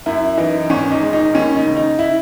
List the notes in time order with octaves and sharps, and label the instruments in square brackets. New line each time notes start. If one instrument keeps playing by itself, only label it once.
[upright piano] F#2 E4
E3 D#4
G#1 C#4
D#4
G#3
D#4
D#2 C#4
D#4
C#3
D#4
E4